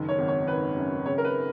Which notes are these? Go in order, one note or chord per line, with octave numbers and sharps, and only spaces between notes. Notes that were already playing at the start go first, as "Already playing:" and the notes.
Already playing: F#1 D#3
C#5
G#1
C#5
D#3 B4
F#2
C#3 C#5
A#4
B4